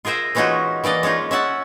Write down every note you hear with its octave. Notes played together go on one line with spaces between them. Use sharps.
F4 G#4 A#4 C5 E5
E3 G#3 C#4 D#4 F4 F#4
E3 A#3 D5 D#5
G#3 C#4 D#4 F4
C#4 E5 F#5 A5